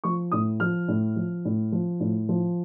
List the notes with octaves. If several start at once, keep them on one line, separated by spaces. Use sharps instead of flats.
F3 C#6
A2 D#6
F3 F6
A2
F3
A2
F3
A2
F3